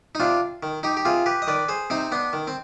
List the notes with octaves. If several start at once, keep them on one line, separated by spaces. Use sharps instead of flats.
D#4
C3 D4 F4
D#3
D#4 G4
G4
C3 F4 G#4
G4 B4
D#5
D#3 B4 D5
G#4 C5
C3 C4 D#4
B3 D4
D#3
C4